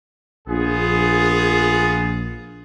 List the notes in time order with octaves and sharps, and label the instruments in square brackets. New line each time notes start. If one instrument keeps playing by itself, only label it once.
[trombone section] A#1 [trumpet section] B3 F4 G#4